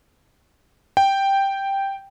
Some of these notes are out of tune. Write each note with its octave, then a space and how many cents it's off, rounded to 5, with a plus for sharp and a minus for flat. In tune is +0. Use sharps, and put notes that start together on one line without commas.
G5 +0